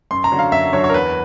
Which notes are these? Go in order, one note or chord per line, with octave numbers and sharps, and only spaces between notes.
F#2 C6
A#5
D3 F#3
F5
F#2 E5
D3 F#3 C#5
C#5
A#4
E2 B4